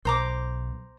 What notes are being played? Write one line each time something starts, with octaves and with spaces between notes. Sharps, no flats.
B1 C5 A#5 D6